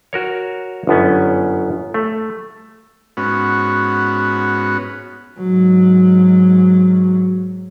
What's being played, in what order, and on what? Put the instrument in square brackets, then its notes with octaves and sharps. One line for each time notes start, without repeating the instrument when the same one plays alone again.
[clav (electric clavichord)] F#4 A#4 C#5
G1 F#2 B3 C#4
A3
[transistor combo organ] G#2 B3 C#4 F#4
[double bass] G#2 F#3